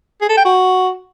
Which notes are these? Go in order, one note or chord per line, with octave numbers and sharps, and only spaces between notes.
G#4
A4
G5
F#4